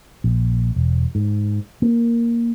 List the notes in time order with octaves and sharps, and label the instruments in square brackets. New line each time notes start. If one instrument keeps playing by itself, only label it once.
[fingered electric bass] A#1
E1
G#2
A#3